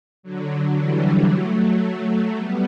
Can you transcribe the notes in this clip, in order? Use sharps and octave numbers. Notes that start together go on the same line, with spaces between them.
D3 F#3
E3 G3
F#3 A3
G3 B3